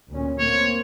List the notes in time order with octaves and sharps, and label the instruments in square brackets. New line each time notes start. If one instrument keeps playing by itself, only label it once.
[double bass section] D2 A#2 C#4
[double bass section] A#3 C4 [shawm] C#5